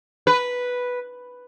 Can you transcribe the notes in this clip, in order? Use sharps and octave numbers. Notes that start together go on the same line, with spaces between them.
B4